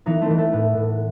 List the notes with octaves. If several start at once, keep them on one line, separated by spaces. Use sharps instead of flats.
E3 B3 D#4
A3 C4
E3
A3
A2 B3
A2